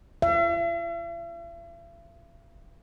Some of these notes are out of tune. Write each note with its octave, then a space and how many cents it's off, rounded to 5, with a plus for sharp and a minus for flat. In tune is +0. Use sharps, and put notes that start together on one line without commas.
E5 +45